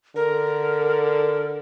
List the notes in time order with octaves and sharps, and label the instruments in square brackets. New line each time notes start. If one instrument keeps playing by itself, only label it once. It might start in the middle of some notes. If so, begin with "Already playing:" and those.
[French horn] D3 [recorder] A#4